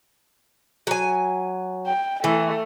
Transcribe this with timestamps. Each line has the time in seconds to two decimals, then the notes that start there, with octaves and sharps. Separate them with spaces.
0.87 F#3 G#5
1.87 G5
2.24 E3 A3